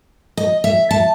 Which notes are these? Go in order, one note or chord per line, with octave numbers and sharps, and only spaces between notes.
D#5
E5
A5